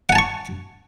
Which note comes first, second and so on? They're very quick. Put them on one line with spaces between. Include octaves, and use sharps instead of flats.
F#5 G#5 A5 C#6